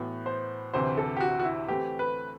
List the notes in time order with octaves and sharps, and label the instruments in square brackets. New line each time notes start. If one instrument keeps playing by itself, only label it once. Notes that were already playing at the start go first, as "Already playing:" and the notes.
Already playing: [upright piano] A2 E3 B3 F#4
[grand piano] C5
[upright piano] D2 C3 E3 [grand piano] C5
[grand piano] A4
G4
F#4
F#4
E4
[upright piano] E3 A3 C4 [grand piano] G4
[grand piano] B4